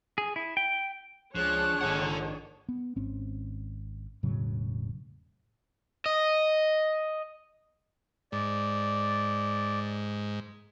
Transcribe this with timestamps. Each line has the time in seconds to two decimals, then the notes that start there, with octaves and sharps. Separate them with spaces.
0.18 G#4
0.36 E4
0.57 G5
1.35 C#2 F3 D4 G#4 C#5 F#6
1.81 A#1 G#2 D#3 A4 F#5
2.69 B3
2.96 G#1 C4 C#4
4.23 E1 A2 C#3 F#3
6.06 D#5
8.32 G#2 D5